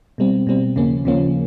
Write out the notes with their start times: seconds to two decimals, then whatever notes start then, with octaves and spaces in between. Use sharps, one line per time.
0.18 B2 G3 C4
0.47 B2 G3 C4
0.76 D#2 C#3 F3 A#3 C#4
1.05 D#2 C#3 F3 A#3 C#4